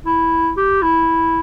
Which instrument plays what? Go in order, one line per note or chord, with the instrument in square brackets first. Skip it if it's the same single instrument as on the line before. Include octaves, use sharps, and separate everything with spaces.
[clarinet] E4
G4
E4